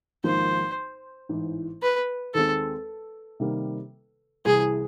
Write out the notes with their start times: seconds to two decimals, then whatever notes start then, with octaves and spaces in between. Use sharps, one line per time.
0.24 G#1 G#2 F3 A#3 C5
1.29 A1 G#2 E3
1.82 B4
2.34 D#2 D#3 G#3 C4 A4
3.40 C3 D#3 G3 A#3
4.45 C2 C3 E3 G#4